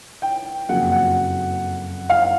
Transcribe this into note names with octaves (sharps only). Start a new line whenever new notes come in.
G5
F#1 F2 C#3 F#3 A#3 F#5
F#5
F5